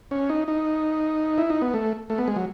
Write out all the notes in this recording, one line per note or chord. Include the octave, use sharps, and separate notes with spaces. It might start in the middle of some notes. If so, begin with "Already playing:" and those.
C#4
D#4
D#4
E4
D#4
B3
A3
A3
B3
G#3
F#3